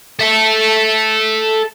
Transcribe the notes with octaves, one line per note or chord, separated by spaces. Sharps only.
A4 E5